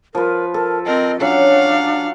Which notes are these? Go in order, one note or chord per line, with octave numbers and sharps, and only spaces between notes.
F3 A#4 B4
A4 A#4
C4 A#4 D#5
F#3 C#4 D4 A4 F5 F#5